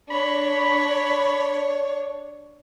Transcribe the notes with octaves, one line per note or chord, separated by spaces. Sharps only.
D4 C#5 B5